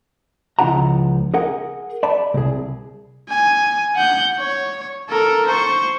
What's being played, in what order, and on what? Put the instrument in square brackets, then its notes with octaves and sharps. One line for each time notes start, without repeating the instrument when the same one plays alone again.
[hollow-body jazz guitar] C#2 F3 E4 F4 F#5 A#5
G#4 A#4 F#5
D5 A5 B5
C2 G#4
[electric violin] G#5
F#5 G6
C#5
A4 A#4
C5 C#6